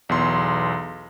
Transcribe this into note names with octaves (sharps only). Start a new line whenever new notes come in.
B1 E2 C6